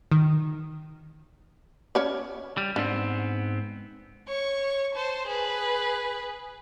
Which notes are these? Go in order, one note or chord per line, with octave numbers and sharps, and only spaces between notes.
D#3
C#4 C#5 D5
G3
G#2 B3 C4 D4
C#5 C#6
C5 A5
G#4 B4